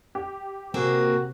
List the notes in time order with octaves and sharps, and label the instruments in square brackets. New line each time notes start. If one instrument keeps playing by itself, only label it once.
[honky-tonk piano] G4
[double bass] C3 [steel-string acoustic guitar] A#3 C4 G#4 [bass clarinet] F#4